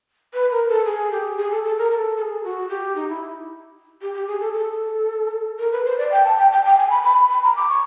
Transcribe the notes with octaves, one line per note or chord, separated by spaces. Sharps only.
B4
A#4
A4
G#4
G4
G#4
A4
A4
A#4
A#4
A4
A4
G#4
F#4
G4
D#4
E4
G4
G4
G#4
A4
A4
A#4
B4
C5
D5
G5
A5
G5
G5
G5
G#5
B5
B5
B5
A#5
D6
C#6